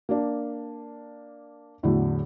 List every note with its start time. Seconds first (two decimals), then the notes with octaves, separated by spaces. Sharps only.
0.09 A#3 D4
1.83 E2 A2 D3 F#3